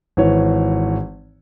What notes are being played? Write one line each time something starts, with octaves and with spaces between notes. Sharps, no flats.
G#1 E3 C#5